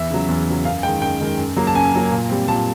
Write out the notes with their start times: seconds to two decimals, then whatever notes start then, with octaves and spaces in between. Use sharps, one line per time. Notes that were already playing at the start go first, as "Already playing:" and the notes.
Already playing: E2 E5
0.10 C#3 F#3
0.28 E2
0.47 C#3 F#3
0.65 F#2 F5
0.83 G#3 G5
0.88 D#3
1.02 F#2 G5
1.20 D#3 G#3
1.38 F#2
1.57 C#3 F#3 A#3
1.67 A5
1.75 F#2 G#5
1.94 C#3 F#3 A#3
2.12 A#2
2.29 G3 C4
2.48 A#2 A5